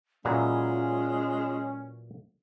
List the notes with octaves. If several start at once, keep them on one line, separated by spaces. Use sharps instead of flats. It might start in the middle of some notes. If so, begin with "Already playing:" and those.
A#2 E3 F#3 G#3 C#4 F4